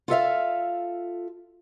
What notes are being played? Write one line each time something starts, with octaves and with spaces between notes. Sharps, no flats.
F4 A4 E5 F5